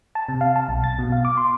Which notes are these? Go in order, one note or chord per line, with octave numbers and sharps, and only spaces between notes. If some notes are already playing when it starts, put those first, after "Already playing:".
A5
C3
F5
A5
B1
A6
B2
F5
D6
C6